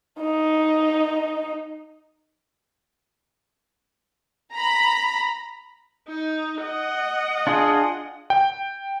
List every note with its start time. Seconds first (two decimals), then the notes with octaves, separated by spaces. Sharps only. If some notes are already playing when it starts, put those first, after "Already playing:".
0.19 D#4 D#5
4.53 A#5 B5
6.08 D#4
6.61 D#5 F#5
7.47 D4 F4 G#4
8.30 G5